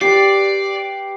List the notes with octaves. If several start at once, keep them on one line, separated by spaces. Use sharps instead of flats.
G4 B4 D5 C7